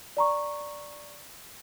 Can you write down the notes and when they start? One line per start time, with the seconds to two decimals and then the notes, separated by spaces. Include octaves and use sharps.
0.17 D5 A#5 C#6